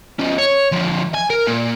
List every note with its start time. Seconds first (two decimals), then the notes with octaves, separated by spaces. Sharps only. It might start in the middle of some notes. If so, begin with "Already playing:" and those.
0.19 F3 C#4
0.38 C#5
0.72 D3 F3
1.14 G#5
1.30 A#4
1.47 A#2